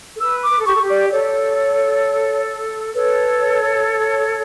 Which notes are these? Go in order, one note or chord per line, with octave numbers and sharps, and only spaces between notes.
A4
B4 E6
D6
B4
A4
G4 C#6
A4
G4
D5
A4 C#5
A4 B4 C#5